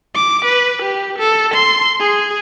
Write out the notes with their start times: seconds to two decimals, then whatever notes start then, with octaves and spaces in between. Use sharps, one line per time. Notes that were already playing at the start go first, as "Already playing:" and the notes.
0.15 D6
0.45 B4
0.82 G4
1.19 A4
1.54 C6
2.00 G#4